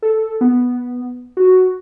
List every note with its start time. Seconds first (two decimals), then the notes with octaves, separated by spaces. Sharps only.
0.02 A4
0.41 B3
1.37 F#4